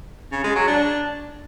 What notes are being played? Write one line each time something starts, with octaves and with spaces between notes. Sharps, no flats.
C#3
G#3
F#3
D4